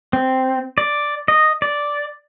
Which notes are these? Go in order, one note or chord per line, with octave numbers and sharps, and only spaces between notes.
C4
D5
D#5
D5